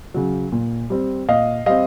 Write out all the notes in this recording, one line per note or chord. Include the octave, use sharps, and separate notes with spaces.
C#3 F#3
A#2
G3 C4
A#2 D#5 F5
G3 C4 D#5 F5